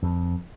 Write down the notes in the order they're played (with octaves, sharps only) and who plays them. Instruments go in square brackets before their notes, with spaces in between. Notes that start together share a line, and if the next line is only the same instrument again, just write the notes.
[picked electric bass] F2